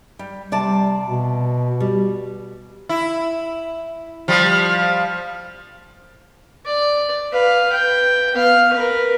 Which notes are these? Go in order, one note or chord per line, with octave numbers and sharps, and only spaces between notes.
G3
C3 G3 D5 A5
B2
G3
E4
F3 G3
D5
B4 F5
G5
B3 F5
A#4 B4